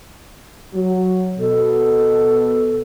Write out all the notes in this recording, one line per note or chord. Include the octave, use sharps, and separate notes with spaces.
F#3
B2 A4